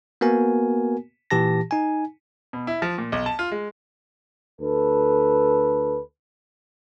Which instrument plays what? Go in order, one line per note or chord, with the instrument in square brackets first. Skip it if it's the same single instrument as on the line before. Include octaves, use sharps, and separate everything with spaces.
[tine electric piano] A#3 B3 F#4 A#4 G#5
A#2 E3 G4 A5 A#6
D#4 G#5
[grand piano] B2
E4
F3
A#2
B1
A5
F4
G#3
[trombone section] D2 A4 B4